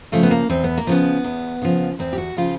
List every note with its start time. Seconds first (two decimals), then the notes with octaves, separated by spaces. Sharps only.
0.12 C#3 F3 A3
0.23 B3
0.31 A#3
0.49 E2 C4
0.64 B3
0.78 A#3
0.87 C#3 F3 B3
1.24 E2
1.62 C#3 F3
1.99 E2 C4
2.13 G4
2.18 F#4
2.37 C#3 F3 F4